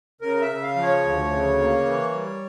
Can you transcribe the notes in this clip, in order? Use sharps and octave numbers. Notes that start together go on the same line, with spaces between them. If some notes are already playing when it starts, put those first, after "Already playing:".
C#3 A#4
E5
C#3
F5
F3
C#5
D2
C#3
A#3
E3
G3